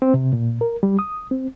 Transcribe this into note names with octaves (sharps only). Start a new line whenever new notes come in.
C4
C3
A#2
A#4
G3
D#6
C4